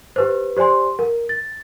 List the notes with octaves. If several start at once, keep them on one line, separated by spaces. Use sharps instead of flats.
G4 B4 C5
G4 C5 D5 G#5 C6
A#4
A6